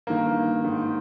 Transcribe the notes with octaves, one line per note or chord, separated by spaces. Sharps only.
G2 D#3 A#3
G#2 D#3